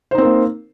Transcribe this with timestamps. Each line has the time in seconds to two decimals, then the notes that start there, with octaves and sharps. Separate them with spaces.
0.11 C5
0.15 D#4
0.18 C4
0.22 A#4
0.25 A#3